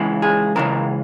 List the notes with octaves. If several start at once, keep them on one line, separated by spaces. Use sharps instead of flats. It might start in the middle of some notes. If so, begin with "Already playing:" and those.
Already playing: C#2 C#3 E3
G#4
C#2 C#3 E3 A#4